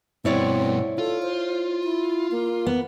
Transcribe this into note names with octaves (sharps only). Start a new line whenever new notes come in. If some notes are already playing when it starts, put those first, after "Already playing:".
G2 B2 C4 E4 C#5 D5
F4 A4
C5
E4
A#3
B3